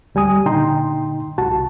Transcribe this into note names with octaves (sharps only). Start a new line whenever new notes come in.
D2 G3 G#5 D#6
A#2 D3 D#4 G5 A#5 C6
C2 F#4 A5